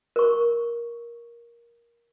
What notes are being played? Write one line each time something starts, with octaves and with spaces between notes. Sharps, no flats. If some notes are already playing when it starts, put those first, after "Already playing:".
A#4 C#6